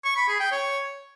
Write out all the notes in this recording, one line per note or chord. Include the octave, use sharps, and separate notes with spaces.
C#6
B5
G#4
G5
C#5